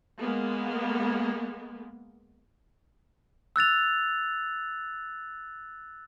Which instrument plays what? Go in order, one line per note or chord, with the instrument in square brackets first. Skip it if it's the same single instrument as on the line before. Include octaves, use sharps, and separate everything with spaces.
[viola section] G#3 A#3 B3
[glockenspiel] E6 F#6 A6 F7